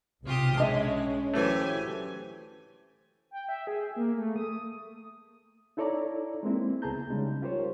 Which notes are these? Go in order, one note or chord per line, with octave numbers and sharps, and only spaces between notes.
B1 C3 F4 G4 D#6
G#3 C#4 D4 D#5 E5
E3 F#3 A3 G4 C5 G#5
G5
E5
G#4
A#3
A3
D#6
D#4 E4 A4 C#5 D5 A#5
G#3 A#3 C4 E4
C#2 B3 G#4 A5 A#5 G6
C#3 G3 G#3 D#4
F4 G4 A#4 C5 C#5